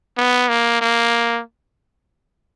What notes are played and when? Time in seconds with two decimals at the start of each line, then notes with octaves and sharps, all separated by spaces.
0.17 B3
0.49 A#3
0.81 A#3